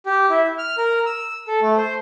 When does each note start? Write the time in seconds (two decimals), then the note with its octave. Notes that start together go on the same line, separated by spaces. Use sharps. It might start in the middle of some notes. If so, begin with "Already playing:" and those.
0.06 G4
0.30 E4
0.58 F6
0.77 A#4
1.06 E6
1.48 A4
1.61 A3
1.77 C5